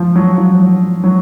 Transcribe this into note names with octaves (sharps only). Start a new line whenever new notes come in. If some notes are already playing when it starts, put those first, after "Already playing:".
Already playing: F3
F#3
F3
F#3
F#3